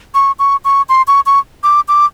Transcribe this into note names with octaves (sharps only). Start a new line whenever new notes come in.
C#6
C#6
C#6
C6
C#6
C#6
D6
D6